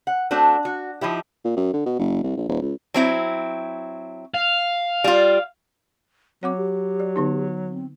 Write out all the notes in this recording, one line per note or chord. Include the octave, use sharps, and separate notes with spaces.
F#5
A3 C4 D4 F#4
F#4
F3 D#4 E4 G4
A#2
F#2
D3
B2
F#1
C2
A#1
D#1
C#2
F#3 C4 E4
F5
G3 F4
F#3 C4 C#5 F#5 D6
G4
D5
D3 B3 D#4
C4